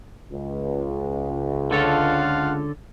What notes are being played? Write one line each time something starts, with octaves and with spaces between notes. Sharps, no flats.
C#2
D3 F4 A4 C#5 F5 F#5